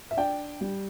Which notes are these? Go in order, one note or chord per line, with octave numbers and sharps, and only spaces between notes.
E5
D4 D5 G5
G3